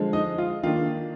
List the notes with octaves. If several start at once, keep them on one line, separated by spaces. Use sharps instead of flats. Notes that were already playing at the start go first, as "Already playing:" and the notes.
Already playing: D3 F3 G#3
D#4 D#5
F4
D#3 A#3 D4 F4